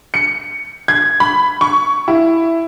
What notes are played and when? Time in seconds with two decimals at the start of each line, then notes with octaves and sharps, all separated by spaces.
0.14 C#7
0.88 G#6
1.20 B5
1.61 C#6
2.08 E4